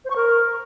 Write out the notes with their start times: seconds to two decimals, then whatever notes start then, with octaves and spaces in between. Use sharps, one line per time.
0.05 C5
0.10 C#6
0.16 A#4